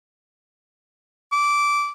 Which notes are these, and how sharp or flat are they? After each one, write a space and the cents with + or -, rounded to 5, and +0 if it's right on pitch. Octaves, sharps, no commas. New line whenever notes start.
D6 -15